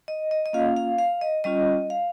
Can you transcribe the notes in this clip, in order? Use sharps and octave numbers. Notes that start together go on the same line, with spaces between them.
D#5
D#5
D#5
A#3 C#4 F4 F5
F5
F5
D#5
G3 C#4 F4 D#5
F5